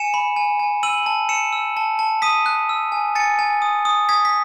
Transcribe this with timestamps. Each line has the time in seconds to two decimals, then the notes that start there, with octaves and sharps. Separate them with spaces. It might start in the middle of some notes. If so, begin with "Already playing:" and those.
Already playing: G#5 C#7 E7
0.14 B5
0.36 G#5
0.59 G#5
0.83 E6 D#7 F#7
1.06 A5
1.29 E6 C#7 E7
1.53 E6
1.77 A5
1.99 A5
2.22 D#6 B6 D#7
2.46 F#6
2.69 E6
2.92 G#5
3.15 G#5 A6 C#7
3.39 G#5
3.62 D#6
3.85 D#6
4.09 D#6 G#6 B6
4.25 B6